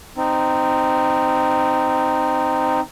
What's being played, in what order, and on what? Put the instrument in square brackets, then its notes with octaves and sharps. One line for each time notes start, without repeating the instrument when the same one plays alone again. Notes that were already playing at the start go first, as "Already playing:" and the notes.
[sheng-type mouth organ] C4 D#4